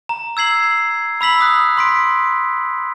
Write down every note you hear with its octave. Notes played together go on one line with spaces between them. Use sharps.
A#5
E6 G#6 C7 F#7
B5 E6 B6 F#7
D#6 F#6
C6 B6 D7